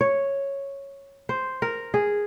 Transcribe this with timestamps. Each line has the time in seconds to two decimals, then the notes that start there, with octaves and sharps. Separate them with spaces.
0.01 C#5
1.29 C5
1.62 A#4
1.94 G#4